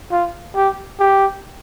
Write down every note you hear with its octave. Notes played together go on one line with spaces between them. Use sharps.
F4
G4
G4